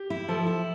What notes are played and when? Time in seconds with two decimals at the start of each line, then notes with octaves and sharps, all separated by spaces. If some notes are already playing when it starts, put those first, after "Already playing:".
Already playing: G4
0.10 E4
0.29 F3 A4
0.47 E4